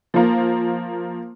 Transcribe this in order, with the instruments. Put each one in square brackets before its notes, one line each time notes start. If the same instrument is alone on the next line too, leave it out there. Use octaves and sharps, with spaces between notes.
[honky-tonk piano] F3 A#3